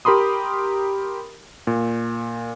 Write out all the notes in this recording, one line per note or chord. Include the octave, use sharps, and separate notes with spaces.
G4 A#4 B5 C6 D#6
A#2